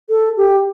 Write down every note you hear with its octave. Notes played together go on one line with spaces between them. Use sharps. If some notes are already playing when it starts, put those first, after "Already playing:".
A4
G4